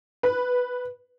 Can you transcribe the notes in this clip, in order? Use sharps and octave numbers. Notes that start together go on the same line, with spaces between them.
B4